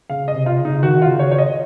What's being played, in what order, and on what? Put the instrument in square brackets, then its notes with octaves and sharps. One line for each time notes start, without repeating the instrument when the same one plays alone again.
[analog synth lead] C#3 [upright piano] F5
[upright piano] D#5
[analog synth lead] C3
[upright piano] F4
[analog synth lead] C#3
[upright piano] D#4
[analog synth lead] D#3 [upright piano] F#4
[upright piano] F4
[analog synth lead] C#3
[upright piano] C#5
C#5
D#5